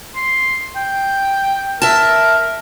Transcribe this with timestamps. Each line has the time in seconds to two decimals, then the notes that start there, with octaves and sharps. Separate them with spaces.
0.16 C6
0.76 G5
1.82 A#4 E5 A5